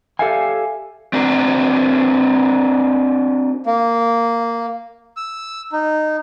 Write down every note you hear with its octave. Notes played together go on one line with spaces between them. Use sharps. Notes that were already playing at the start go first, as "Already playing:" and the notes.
G4 A4 D5 E5 F5 G#5
C4 D4 F#4 A#4
A#3
E6
D#4